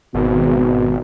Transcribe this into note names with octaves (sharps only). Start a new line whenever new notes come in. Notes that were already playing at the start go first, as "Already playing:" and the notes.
G#1 B2